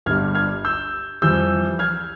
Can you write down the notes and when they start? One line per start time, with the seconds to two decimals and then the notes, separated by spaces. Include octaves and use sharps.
0.06 G1 G2 G3 F6 G#6
0.35 F6 G#6
0.65 E6 G6
1.22 F2 E3 G3 E6 G6
1.79 F6 G#6